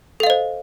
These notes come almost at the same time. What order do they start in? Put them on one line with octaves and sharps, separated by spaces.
A4 F5 D#5 C5